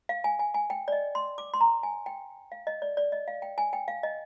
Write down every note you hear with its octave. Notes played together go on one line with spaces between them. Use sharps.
F5
G#5
G#5
G#5
G5
D5
D#5
C6
D6
C6
A#5
G#5
G5
F5
D#5
D5
D5
D#5
F5
G5
G#5
G5
F5
D#5